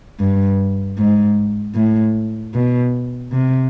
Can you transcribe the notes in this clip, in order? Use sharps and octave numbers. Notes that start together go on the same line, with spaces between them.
G2
G#2
A2
B2
C3